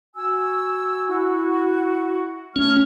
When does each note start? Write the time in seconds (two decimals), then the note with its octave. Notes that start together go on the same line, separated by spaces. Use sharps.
0.16 F#4 G#5 E6
1.09 E4 F#4
2.56 A3 C#4 C#5 F6